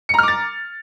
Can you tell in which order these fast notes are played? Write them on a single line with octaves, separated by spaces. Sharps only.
C#7 A#5 F6 D6 A6